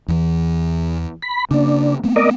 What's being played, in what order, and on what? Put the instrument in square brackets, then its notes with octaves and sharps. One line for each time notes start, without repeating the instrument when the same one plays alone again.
[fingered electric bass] E2 E3
[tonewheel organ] B5
[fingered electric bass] C#3 A#3 [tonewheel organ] D4
[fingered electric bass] A3 B3 C4
[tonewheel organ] A#4 D5 D#5